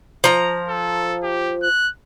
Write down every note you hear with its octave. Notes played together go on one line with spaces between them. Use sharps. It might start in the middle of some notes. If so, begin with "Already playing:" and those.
F3 A#5
A4
G4
F#6